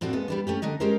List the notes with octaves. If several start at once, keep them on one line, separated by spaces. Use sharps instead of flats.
A2 C4 D4 F#4 A4
A#2 G#3 B3 A4
G3 B3 D4
A3 C#4 G4
D3 D4 D#4 D#5
G#3 C#4 G4 A4 A#4 C5